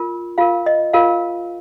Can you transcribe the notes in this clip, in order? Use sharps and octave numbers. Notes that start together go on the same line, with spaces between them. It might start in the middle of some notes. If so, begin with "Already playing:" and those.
Already playing: F4 A#4
F4 A#4 F5
D#5
F4 A#4 F5